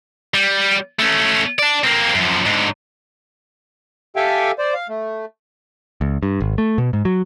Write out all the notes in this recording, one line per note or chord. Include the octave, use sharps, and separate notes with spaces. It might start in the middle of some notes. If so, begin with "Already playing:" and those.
G3
A3 C#4
D4 D5
A#3 C4
F#2 F3
G#2 D3
G4 A4 E5 F5 G5 G#5
C5 D5
F5
A3
C#2
G2
G#1
A3
B2
G#2
F#3